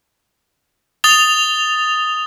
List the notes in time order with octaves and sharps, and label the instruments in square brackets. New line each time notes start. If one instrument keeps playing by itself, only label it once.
[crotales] D#6 A6 F7 G7